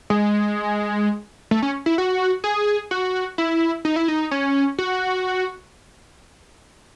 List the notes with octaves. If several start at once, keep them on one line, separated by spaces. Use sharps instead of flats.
G#3
A3
C#4
E4
F#4
G#4
F#4
E4
D#4
E4
D#4
C#4
F#4